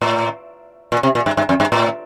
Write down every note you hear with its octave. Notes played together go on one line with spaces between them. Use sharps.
A2
A#2
C3
A#2
G2
G2
F2
G2
A2